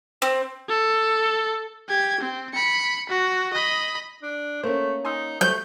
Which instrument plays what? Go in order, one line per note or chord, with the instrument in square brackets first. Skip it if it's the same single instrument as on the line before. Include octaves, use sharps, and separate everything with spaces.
[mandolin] C4
[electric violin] A4
G4 G#6
C4
B5 C#7
F#4
D#5 B5
[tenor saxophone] D4
[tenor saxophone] A3 [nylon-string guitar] A#3 C#4 [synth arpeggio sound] C5
[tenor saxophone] D#4 [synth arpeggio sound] G#5 C6 E6
[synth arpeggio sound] F#3 G3 C5 [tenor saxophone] A3 [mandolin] G6